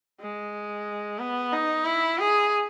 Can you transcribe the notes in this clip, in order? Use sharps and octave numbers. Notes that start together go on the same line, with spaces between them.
G#3
B3
D#4
E4
G#4